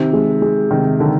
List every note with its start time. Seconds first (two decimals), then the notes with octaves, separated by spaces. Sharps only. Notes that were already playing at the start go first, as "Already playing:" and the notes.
Already playing: C3 D#3
0.13 G#3
0.42 G#3
0.71 C3 D#3
1.00 D3 D#3